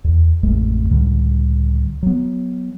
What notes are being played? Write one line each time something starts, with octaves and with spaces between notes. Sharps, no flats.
E2
A1 F2 G#3 A3
C#2 A2 D3 G3
F#3 B3